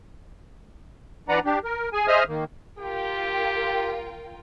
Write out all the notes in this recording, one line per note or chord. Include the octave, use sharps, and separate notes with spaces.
E3 D4 B4 D5 F#5 A#5
D4 G4
A#4
G#4 G#5
G#4 C5 D#5 E5 D#6 F6
D#3 A#3
F4 G4 A#4 G5